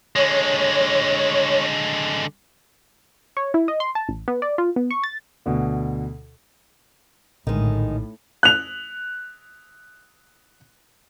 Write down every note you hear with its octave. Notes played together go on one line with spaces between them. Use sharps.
D3 G#3 C#5
C#5
E4
D#5
C6
A5
A1
B3
D5
F4
B3
C#6
A6
D2 B2 D3
A#1 A2 D3 D#3 G#3
F#6 F7